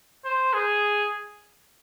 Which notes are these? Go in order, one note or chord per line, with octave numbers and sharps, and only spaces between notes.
C5
G#4